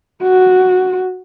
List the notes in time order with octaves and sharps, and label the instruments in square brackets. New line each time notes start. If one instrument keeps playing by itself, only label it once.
[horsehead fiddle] F#4